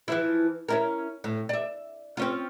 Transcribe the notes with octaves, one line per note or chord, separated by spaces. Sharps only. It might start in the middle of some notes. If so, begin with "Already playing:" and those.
E3 F3 E4
C#4 E4 A#4
A2
D5 E5
C4 C#4 F4